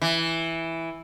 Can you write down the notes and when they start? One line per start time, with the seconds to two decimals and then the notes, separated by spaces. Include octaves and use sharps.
0.02 E3